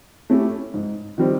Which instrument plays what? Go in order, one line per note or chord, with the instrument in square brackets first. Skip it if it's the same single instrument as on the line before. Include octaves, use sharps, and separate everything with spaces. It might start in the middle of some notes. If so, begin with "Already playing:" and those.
[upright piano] A3 C#4 E4 G4
G#2
D#3 G3 C4